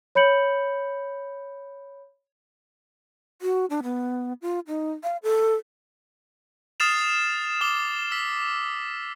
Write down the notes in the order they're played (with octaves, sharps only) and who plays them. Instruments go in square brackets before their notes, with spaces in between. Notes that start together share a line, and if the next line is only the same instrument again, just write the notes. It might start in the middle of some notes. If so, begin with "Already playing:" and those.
[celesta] C#5 B5 G6 C#7 F#7
[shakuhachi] F#4
D4
B3
F4
D#4
F5
A4
[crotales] D#6 F6 A6 C7 E7 F7
D6 D#6 G7
E6 B6